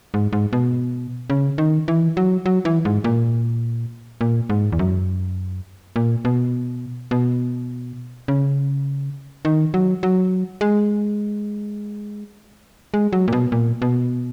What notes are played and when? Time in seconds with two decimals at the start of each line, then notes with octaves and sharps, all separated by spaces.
0.14 G#2
0.33 G#2
0.53 B2
1.30 C#3
1.58 D#3
1.88 E3
2.17 F#3
2.46 F#3
2.65 E3
2.85 G#2
3.04 A#2
4.21 A#2
4.50 G#2
4.72 E2
4.79 F#2
5.96 A#2
6.25 B2
7.11 B2
8.28 C#3
9.45 D#3
9.74 F#3
10.03 F#3
10.61 G#3
12.94 G#3
13.13 F#3
13.28 A#2
13.33 B2
13.52 A#2
13.82 B2